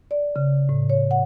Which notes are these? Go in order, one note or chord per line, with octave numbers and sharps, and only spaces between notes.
D5
C#3
A2
C#5
F#5